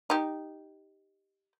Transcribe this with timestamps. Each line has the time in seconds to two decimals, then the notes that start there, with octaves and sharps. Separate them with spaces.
0.10 D#4 G4